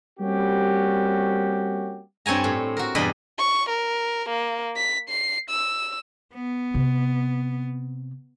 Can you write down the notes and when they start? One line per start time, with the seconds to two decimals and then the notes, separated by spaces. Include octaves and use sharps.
0.20 G3 A#3 C4 C#4 F#4 G4
2.26 G2 C4 C#5 G#5 A#5
2.44 A2
2.77 F#4 A#4
2.95 E2 G2 B2 D5 D#5 B5
3.38 C#6
3.69 A#4
4.29 A#3
4.77 B6
5.09 C7
5.50 E6
6.34 B3
6.74 C3